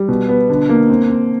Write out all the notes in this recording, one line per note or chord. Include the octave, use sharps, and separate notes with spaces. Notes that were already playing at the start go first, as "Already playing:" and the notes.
Already playing: G3
B2
B3
D3
A#3
C4
C4